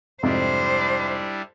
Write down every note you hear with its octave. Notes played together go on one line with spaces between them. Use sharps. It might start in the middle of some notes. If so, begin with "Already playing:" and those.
F2 G#2 C3 G3 D4 E4 C5